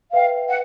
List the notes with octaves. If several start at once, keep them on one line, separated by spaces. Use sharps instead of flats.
B4 E5 F5 G5
F#5